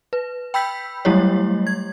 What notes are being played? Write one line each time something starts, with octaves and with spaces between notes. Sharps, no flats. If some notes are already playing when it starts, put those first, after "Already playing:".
B4
G5 B5 E6 G6 B6
F#3 G3 A3 E4 G4 C#5
G#6